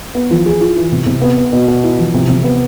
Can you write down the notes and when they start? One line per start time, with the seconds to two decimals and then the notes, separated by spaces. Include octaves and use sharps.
0.15 B3
0.31 F3
0.46 G#4
0.61 F4
0.76 E3
0.92 C3
1.07 C3
1.22 B3
1.38 B3
1.53 B2
1.68 B2
1.84 E4
1.99 F3
2.14 C3
2.29 C3
2.44 B3